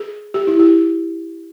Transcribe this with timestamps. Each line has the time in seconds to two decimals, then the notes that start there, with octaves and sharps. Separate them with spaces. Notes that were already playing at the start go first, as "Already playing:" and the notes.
Already playing: G#4
0.34 G4
0.47 E4
0.59 G4